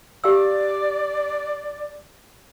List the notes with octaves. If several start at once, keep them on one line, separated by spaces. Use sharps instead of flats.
G4 D5 F5 E6